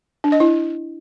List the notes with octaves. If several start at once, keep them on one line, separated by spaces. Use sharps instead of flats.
D4
D#5
E4